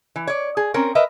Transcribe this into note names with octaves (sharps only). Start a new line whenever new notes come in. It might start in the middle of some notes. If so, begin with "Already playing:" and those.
E3
C#5 D5
G#4
C4 C#4 A#4
A#4 B4 D#5 E5